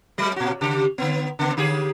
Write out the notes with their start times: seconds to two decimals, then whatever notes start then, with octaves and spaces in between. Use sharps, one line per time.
0.18 F#3 G#3
0.36 A#2 F#4
0.61 C#3 G4
0.98 D3 B3
1.39 C#3 B3
1.57 D3 G4 G#4